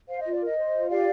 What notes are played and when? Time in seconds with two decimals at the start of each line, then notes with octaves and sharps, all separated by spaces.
0.09 C5 F5
0.21 F4 D#5
0.33 D5
0.42 A#4 D#5
0.58 C5
0.74 F4
0.90 G4 D5 F5